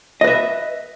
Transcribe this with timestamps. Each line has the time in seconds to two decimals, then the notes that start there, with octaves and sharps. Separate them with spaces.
0.21 D#5
0.24 B4
0.27 E5